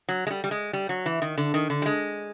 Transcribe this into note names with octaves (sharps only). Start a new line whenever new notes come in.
F#3
G#3
G3
G3
G#3
G3
F#3
E3
D#3
D3
D#3
D3
G3
G#3